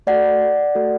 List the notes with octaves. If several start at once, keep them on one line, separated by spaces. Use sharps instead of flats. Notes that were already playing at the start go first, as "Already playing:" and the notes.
A3 F#4 A4 D5 F#5
A3 F#4 A4